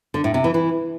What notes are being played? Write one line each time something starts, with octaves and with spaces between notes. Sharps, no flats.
D3
A2
C3
E3
E3